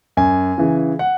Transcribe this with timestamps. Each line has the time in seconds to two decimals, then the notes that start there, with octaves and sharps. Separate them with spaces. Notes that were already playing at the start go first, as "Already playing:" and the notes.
0.17 F#2 G#5
0.58 C#3 E3
0.99 F#5